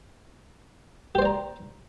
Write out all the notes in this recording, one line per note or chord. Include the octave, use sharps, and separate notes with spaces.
G4 C5 D5 A#5